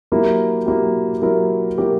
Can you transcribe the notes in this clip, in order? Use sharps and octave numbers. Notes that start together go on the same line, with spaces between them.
F#3 A#3 E4 G4 A#4
F#3 A#3 E4 G4 A#4
F#3 A#3 E4 G4 A#4
F#3 A#3 E4 G4 A#4